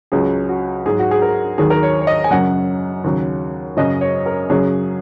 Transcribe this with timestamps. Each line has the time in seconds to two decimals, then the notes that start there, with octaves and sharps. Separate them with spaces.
0.12 C#2 C#3 F#3 G#4
0.49 F#4
0.85 G#2 F#3 G#4
0.99 F#4
1.11 G#4
1.22 A#4
1.58 D#2 D#3 F#3 G#4
1.70 A#4
1.83 C#5
2.01 C#5
2.07 D#5
2.24 G#5
2.31 F#2 C#3 F#3 F#5
3.04 D#2 C#3 F#3
3.77 F#2 C#3 F#3 D#5
4.01 C#5
4.26 A#4
4.50 F#2 C#3 F#3 G#4